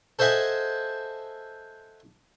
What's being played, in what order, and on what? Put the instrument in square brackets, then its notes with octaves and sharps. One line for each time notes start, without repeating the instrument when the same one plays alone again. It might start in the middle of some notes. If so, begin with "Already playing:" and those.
[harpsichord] A4 C5 D#5 E5 F#5 G#5